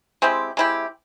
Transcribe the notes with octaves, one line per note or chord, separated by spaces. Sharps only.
G#3 C4 E4 G4
G#3 C4 E4 G4